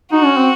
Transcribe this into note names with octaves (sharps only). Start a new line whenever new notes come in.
D#4 F#4
C#4
C4